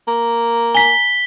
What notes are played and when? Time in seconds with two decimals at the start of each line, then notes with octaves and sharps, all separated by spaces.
0.08 A#3
0.75 G#5 A#5 B6 G7